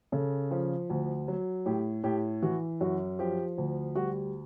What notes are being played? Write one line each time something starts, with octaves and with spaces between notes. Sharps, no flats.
C#3 A4
F3
D2
F#3
A2 G4
A2 G4
E3 F#4
F#2 F#4
F3 G4
D2
G3 F#4